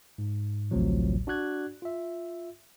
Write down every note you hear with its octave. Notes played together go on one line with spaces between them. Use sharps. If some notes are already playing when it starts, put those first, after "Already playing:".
G#2
A1 D2 A2 C3 F3 F#3
D4 F#4 D5 F#6 G#6
F4 E5